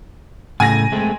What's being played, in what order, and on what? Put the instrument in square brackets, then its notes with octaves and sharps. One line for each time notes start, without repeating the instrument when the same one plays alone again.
[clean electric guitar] A2 C#3 A3 [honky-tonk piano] G#5 A#6
[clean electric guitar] G#3 A3 C4